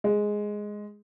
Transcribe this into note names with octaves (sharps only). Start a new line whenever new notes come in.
G#3